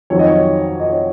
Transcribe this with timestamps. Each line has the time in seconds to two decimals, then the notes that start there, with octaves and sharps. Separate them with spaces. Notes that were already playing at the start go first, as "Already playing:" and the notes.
0.10 F2 D#3 F#3 C#5
0.19 D#5
0.27 C#5
0.80 D#5
0.90 C#5